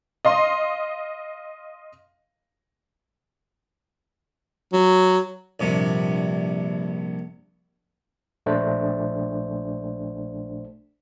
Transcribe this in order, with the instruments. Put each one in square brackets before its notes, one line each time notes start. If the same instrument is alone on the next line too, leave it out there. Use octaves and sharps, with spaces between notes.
[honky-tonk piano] D#5 F5 C6
[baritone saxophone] F#3
[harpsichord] A#1 G2 C3
[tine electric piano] A#1 A3 D4 C5